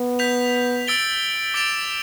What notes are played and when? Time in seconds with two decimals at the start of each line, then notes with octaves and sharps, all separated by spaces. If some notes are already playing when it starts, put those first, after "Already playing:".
Already playing: B3
0.19 G6 B6 F7
0.87 E6 A6 D7 G7
1.54 D6 A6 D7 F7